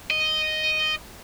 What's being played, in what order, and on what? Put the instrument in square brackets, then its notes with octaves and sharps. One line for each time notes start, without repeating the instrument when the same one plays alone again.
[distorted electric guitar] D#5